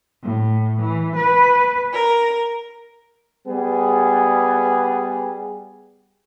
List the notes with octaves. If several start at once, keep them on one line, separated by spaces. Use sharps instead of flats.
A2
E3
B4
A#4
G3 B3 G#4